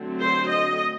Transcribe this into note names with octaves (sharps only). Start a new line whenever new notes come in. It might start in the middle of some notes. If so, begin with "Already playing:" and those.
Already playing: D3 F#3 A3 C4
C5
D#5